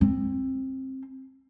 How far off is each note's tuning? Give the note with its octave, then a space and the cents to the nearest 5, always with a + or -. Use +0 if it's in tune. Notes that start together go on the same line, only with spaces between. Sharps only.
C4 +20